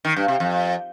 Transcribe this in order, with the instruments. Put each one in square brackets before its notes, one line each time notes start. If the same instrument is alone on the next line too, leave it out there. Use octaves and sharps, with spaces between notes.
[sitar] D#3
G2
C3
F2